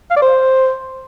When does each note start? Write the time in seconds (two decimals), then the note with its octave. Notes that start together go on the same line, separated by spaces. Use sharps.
0.11 F5
0.16 D5
0.22 C5